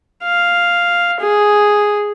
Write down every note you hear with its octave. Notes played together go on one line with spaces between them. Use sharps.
F5
G#4